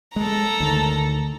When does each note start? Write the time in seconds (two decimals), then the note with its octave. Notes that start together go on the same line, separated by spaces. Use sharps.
0.16 G#3 A4 A#5
0.60 D2 D#3